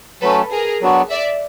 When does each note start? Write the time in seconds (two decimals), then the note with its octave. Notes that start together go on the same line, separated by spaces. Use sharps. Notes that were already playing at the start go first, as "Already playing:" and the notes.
0.21 F#3 A3 C#4 A4 B4
0.51 G#4 A#4
0.81 F#3 B3 D4 F#4
1.10 D5 E5